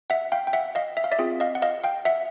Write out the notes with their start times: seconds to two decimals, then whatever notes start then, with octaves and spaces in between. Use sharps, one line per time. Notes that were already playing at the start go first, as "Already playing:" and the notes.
0.10 E5 F#5
0.32 F5 G5
0.47 G5
0.53 E5 F#5
0.75 D#5 F5
0.97 E5
1.04 F5
1.11 D5 E5
1.19 C4 F4 G#4
1.40 D#5 F5
1.55 F#5
1.62 D#5 F5
1.84 F5 G5
2.05 E5 F#5